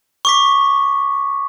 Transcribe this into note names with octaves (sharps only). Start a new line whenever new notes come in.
C#6 D6 B6